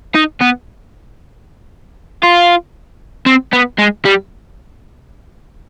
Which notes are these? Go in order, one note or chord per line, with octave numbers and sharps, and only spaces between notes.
D#4
B3
F4
C4
B3
G#3
G3